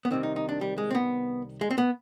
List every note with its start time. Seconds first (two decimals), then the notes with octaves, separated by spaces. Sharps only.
0.05 B3
0.11 C2 C3 D#3 C4
0.23 D#4
0.36 D#4
0.49 D4
0.61 G3
0.78 G#3
0.91 C4
0.95 B3
1.61 G#3
1.71 C4
1.78 B3